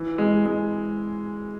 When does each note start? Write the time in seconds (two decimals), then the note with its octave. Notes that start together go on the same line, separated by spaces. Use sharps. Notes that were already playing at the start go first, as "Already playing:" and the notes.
Already playing: E3
0.18 G#3
0.46 G#3